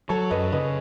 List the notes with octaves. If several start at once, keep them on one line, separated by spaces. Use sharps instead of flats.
F#3 A4 C#5
F#2 B4 D#5
C#3 B4 D#5